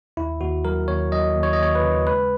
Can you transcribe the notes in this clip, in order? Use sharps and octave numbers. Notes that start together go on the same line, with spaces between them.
D#2 E4
D#2 F#4
F#3 A#4
D#2 C#5
F#3 D#5
D#2
C#5
D#5
D#2 C#5
B4
C#3
G#3 B4